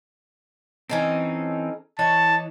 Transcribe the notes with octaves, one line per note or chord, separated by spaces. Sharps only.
E3 C4 C#4 D#4 A4
E3 C#5 D#5 F#5 A5